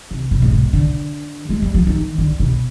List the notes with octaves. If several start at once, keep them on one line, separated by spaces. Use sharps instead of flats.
C3
B2
G#2
B2
D3
G#3
G3
F3
D#3
D3
B2